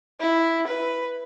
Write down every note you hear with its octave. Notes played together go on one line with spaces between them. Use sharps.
E4
B4